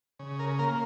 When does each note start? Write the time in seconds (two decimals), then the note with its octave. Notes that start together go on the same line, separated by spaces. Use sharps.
0.19 C#3
0.39 A#4
0.59 A#3 A#4